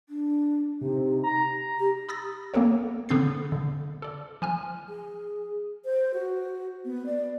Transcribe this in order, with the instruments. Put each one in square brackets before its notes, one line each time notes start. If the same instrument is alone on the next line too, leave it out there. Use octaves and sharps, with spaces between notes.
[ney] D4
[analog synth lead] C3 [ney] D#4
[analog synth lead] A#5
[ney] G4
[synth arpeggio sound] B5 D#6 E6 A6 A#6
A#3 B3 A4 A#4 C#5
D3 B3 C4 G6 A6 C7
D3
A4 D5
F3 G#5 F6
[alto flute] G#4
C5
F#4
B3
D5